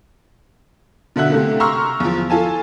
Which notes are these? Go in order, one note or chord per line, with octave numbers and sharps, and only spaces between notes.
B2 D3 F#4 E5 F#6
C3 A3 A#3
A#5 C6 C#6 E6 F6
E2 F3
F4 A4 G#5 A5